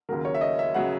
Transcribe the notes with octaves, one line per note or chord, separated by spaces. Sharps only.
D#2 C#3 F#3 A#4
C#5
E5
D#5
E5
C#3 F#3 F#5